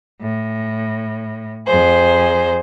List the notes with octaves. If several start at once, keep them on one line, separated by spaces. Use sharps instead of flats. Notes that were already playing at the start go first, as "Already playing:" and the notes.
A2
F2 G#4 C5